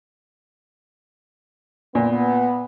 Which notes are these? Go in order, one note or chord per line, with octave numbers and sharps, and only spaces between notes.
A#2 B3